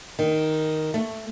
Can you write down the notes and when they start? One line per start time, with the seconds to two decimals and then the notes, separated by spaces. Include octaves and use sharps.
0.19 D#3
0.94 A3